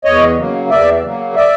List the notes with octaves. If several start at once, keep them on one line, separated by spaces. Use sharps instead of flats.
E2 C#5 D#5
C#3 F#3 A#3
E2 D5 E5
C#3 F#3 A#3
D5 E5